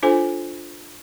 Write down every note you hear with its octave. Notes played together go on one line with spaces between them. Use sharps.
D4 F4 A4 C5 G#5